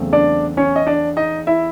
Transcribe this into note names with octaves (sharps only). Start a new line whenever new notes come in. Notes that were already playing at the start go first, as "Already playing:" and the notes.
Already playing: E2 C#3 F#3 A3 C4
D4 D5
C#4 C#5
D#5
D4 D5
D#4 D#5
E4 E5